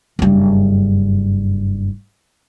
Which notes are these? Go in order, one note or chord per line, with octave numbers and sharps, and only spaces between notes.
F#1 G2